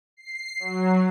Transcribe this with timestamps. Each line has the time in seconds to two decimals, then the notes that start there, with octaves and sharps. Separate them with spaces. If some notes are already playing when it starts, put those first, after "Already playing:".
0.17 C7
0.60 F#3